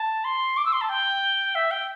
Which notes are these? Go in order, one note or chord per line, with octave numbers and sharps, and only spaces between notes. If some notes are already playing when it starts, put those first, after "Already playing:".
Already playing: A5
C6
D6
E6
C6
A5
G5
E5
G5